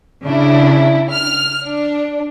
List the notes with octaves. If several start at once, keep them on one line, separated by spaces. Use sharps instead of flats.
C#3 D4 E4
F6
D4